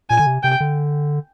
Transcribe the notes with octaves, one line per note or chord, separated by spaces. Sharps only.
A#2 G#5
D3
C3
C3 G5
D3